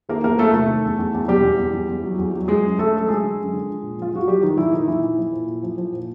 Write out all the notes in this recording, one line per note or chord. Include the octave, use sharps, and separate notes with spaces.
D#3 A#3 A#4
E2 A#3 A#4
E2 A3 A4
C3 A3 A4
D#3
E2
E2
E2
B2 G3 G4
E2
E2
E2
E2
F#3
E2
F#3
F#3 G#3 G#4
F#2
D3 A3 A4
F#2 A4
F#3 G#3 G#4
D3
F#2
D3
F3
A#2
F3 F4
F3 F#4
F3 G3 G4
D#3 F3 D#4
A#2 E3 E4
D#3 F3 D#4
A#2 E3 E4
A#2
F3
A#2
A#2
F3
F3
A#2